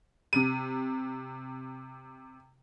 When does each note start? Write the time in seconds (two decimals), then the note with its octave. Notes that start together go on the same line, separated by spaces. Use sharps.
0.33 C3 D#7